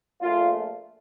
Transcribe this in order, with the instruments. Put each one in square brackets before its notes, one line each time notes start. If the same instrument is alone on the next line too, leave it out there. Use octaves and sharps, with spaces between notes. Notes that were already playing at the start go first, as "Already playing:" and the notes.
[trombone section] A#1 A#2 A3 F4